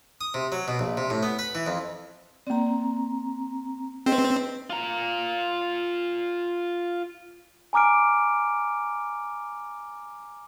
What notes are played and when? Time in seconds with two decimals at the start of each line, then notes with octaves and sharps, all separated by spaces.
0.21 D#6
0.34 C3
0.52 F#3
0.68 B2
0.79 A#1
0.97 C3
1.10 A2
1.23 B3
1.39 B4
1.55 E3
1.67 F2
2.47 A#3 C4 D5 A#5
4.06 C4 G#4 B4 D#5
4.70 F4 A#5
7.73 G#5 A#5 D6 F6 D7